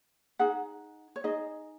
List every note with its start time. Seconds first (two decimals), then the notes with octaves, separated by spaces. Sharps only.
0.39 D#4 G#4 F#5
1.16 C#5
1.24 D#4 G#4 D#5